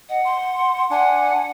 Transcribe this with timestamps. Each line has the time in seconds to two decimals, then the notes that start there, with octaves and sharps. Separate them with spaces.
0.09 D#5 F#5
0.25 C6
0.91 D4 F#5 G#5